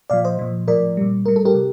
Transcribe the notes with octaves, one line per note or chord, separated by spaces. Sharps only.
A#2 F3 D5 F5
C5 D#5
A#2 F3
A2 F3 A#4 D5
A#2 G3
A2 G3 A#4
A4
G4 A#4
C3